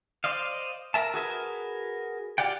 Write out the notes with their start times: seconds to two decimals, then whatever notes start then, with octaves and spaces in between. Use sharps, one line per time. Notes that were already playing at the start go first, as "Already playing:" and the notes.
0.24 C5 D5 D#5 F5
0.94 A#4 E5 A5
1.14 F#4 G#4 A#4 B4
2.38 F4 G4 D5 F#5 G5